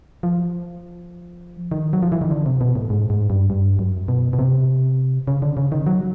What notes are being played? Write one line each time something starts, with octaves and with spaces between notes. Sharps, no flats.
F3
D#3
F#3
F3
E3
D#3
D3
C3
B2
A2
G#2
G#2
G2
G2
F#2
B2
B2
C3
C#3
D3
C#3
D#3
F#3